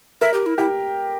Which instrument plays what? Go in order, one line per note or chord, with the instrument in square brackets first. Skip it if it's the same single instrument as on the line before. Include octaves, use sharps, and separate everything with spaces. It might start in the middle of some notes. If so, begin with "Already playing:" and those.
[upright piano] A#4 [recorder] E5
[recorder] G4
E4
[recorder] E4 [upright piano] G4